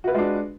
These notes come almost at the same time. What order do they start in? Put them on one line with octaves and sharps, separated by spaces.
F#4 B4 F4 G#3 D4